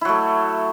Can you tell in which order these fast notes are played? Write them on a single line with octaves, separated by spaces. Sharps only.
E4 F#3 A3